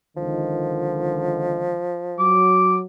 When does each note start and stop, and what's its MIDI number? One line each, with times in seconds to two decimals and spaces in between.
0.17 1.84 37
0.17 1.84 50
0.17 1.84 51
0.17 2.44 53
2.19 2.85 54
2.19 2.76 86